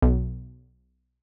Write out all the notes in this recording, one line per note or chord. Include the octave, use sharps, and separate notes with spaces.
B1